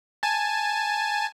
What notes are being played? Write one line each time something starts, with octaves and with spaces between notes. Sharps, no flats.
G#5 A5